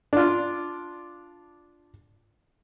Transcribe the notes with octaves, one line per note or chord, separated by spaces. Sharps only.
D4 F4